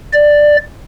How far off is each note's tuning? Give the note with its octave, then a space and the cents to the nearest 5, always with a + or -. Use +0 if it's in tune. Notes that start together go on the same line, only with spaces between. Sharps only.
D5 +10